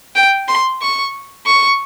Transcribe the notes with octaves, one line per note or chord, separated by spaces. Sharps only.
G5
C6
C#6
C#6